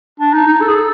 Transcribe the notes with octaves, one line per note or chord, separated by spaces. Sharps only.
D4
D#4
D#4
A4
G#4
A4